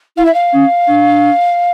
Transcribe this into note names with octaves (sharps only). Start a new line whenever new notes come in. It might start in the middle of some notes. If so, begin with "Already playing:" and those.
E4 F5
E5
F5
C#4
D4